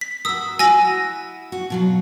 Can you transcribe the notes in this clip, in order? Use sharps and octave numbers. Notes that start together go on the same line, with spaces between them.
B6
F#4 A#4 D#6 E6
E4 F#4 G#5 E6 A#6
F#4
B2 F#3 F4